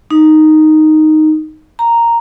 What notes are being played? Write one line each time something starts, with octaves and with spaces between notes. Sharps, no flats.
D#4
A#5